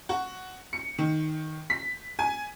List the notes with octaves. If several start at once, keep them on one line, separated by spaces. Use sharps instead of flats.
F#4
C#7
D#3
B6
G#5